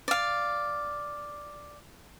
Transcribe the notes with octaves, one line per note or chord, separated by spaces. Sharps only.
D5 F5